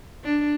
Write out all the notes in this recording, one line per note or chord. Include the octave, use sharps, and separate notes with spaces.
D4